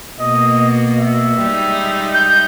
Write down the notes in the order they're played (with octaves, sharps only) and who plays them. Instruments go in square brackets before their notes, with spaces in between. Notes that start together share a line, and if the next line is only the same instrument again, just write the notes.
[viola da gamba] B2 A#3 [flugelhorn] D#5
[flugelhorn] E5
[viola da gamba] G3 G#3 D#4
[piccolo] G6